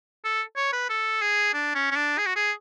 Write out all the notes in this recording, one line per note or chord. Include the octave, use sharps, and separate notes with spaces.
A4
C#5
B4
A4
G#4
D4
C#4
C#4
D4
G#4
F#4
G#4